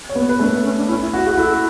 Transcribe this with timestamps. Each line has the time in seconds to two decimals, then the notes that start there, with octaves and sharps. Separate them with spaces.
0.09 C#5
0.15 B3 B4
0.29 B4
0.39 A3 D4 A4
0.52 B3
0.64 C#4
0.77 D4
0.88 C#4 E4
1.01 E4
1.13 F#4
1.25 F#4 G#4
1.37 E4 A4